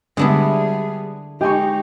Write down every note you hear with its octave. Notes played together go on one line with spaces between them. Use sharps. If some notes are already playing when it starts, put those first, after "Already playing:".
D3 G3 G#3 B3 D4 E4 G#4
G#3 D#4 G4 D#5 G#5 C#6